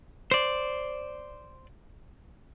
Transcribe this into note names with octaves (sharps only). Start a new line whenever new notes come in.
C5 D5